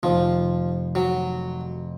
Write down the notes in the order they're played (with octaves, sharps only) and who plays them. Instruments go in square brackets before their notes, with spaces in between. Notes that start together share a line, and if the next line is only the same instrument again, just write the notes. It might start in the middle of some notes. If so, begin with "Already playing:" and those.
[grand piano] F1 F2 C3 D#3 [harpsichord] F3
[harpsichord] F#3